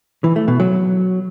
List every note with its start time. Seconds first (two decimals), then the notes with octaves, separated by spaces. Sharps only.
0.24 E3
0.36 A3
0.48 B2
0.60 F#3